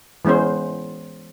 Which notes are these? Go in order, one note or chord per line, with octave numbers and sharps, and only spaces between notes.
E3 G#3 B3 C#4 C5